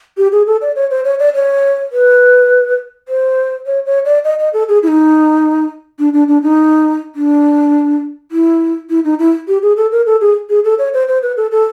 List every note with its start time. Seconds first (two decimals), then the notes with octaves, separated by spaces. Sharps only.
0.18 G4
0.32 G#4
0.47 A4
0.61 D5
0.76 C#5
0.91 C5
1.05 C#5
1.19 D5
1.34 C#5
1.92 B4
3.08 C5
3.66 C#5
3.86 C#5
4.05 D5
4.24 D#5
4.39 D#5
4.53 A4
4.68 G#4
4.83 E4
4.88 D#4
5.99 D4
6.14 D4
6.28 D4
6.43 D#4
7.15 D4
8.32 E4
8.90 E4
9.04 D#4
9.19 E4
9.48 G4
9.63 G#4
9.77 A4
9.92 A#4
10.06 A4
10.21 G#4
10.50 G#4
10.64 A4
10.79 C#5
10.94 C5
11.08 C5
11.22 B4
11.37 A4
11.52 A4